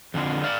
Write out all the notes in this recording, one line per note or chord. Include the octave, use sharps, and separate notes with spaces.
F2 D3 F3
D5 F5